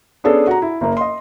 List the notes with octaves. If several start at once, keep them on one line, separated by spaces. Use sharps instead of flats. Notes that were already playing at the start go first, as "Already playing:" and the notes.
B3 C#4 D4 G#4 A4
F#4 A#5
E4
F#1 A#3
D#5 C6